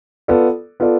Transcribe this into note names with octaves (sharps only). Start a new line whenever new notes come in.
B3 F4 A4 D5
B3 F4 A4 D5